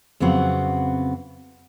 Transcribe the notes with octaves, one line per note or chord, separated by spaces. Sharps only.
F2 C#3 F#3 B3 C4 F#5